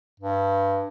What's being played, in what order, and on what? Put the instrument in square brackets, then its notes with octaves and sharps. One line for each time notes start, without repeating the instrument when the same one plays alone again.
[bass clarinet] G2